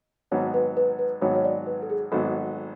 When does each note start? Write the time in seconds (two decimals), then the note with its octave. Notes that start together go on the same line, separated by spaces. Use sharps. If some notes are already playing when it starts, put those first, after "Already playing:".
0.31 G#1 G#2 F#3 B3 C#5
0.54 B4
0.77 B4
0.99 B4
1.21 G#1 G#2 F#3 B3 C#5
1.35 C#5
1.45 D5
1.67 B4
1.82 A4
1.90 G#4
2.12 G#1 G#2 F#3 B3 A4